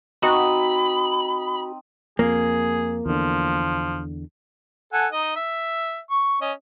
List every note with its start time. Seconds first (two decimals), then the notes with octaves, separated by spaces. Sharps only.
0.23 C4 D#4 F#4 D#5 B5
2.19 F2 A#3 G#4
3.06 E2 D3 F3
4.93 A4 F#5 G#5
5.12 D#4 D#5
5.36 E5
6.10 C#6
6.41 C#4 D#5